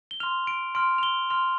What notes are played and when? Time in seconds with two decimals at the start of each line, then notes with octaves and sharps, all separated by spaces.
0.11 G7
0.20 C6 F6 F7
0.47 D7
0.75 C6 F6 D7
0.98 F7
1.03 G7
1.30 C6 F6 F7